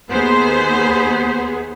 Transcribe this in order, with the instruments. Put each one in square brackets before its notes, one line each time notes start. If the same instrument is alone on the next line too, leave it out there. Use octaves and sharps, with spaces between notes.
[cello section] D#2 B3 G#4 [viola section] C5